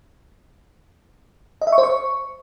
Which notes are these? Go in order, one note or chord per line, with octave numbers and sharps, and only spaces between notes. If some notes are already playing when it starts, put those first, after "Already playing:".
D#5
E5
C#6
C5
C#6